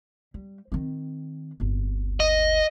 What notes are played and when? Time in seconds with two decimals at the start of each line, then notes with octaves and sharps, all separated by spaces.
0.34 G3
0.72 D#3 C4
1.60 D1 G1
2.20 D#5